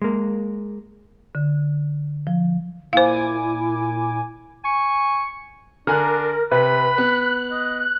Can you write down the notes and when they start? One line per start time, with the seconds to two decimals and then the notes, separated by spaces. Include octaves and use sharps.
0.02 G#3 A#3
1.35 D3
2.27 F3
2.93 A#2 E4 C5 F5 G#5 D6
4.65 G#5 C#6
5.87 D3 D4 A#4 G#5 F#6
6.51 C3 B4 B5
6.98 B3 F#6
7.51 D#5